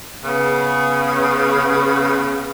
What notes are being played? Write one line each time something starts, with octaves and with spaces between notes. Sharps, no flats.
C#3 B3